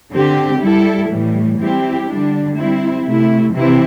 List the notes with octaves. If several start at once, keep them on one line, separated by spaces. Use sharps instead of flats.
D3 C4 G4
G3 E4 A4
A2 E3 G3
G3 C4 E4 G4
D3 G3 D4
G3 C4 E4
C3 A3 E4
C3 E3 C4 E4